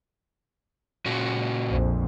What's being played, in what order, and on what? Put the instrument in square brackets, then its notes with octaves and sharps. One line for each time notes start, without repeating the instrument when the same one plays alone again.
[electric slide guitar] A#2 C#4 F#4
[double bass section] A#1 F2